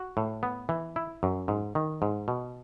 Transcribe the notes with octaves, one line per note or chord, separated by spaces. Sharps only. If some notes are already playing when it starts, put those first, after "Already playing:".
Already playing: F#4
A2
B3
E3
E4
F#2
G#2
D#3
G#2
B2